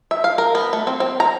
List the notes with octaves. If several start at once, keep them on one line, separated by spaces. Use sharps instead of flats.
E5
F5
A#4
B3
A3
C4
C4
A#5